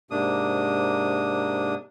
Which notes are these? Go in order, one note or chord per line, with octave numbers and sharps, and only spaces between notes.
G#2 C3 A#3 D4 D#6